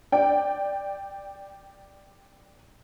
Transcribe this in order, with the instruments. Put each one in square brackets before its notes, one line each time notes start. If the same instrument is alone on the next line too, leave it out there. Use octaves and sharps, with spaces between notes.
[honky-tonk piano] D5 G5